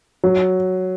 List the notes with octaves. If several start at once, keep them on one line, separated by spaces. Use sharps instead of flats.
F#3